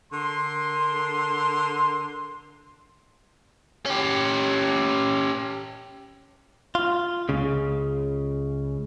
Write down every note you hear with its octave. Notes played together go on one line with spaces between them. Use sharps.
D3 A#4 C6
C#4 G4
F4
C#2 C#3